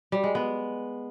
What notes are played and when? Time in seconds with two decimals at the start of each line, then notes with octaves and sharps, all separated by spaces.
0.12 G3
0.24 G#3
0.35 B3